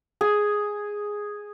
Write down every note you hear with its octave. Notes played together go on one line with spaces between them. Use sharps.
G#4